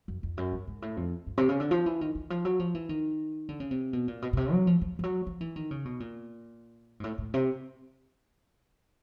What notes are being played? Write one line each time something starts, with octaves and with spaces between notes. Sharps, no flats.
F#2
F2
F#2
G2
G#2
A2
F2
G2
C3
C#3
D3
F3
E3
D#3
E3
F3
F#3
F3
E3
D#3
D3
C#3
C3
B2
A#2
B2
B2
C3
F#3
F3
F3
F3
F#3
F3
E3
D#3
C#3
B2
A#2
G#2
A2
A2
C3